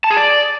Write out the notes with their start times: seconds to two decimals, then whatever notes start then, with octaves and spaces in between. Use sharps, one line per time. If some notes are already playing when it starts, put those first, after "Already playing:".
0.04 A5
0.10 G#4
0.17 D5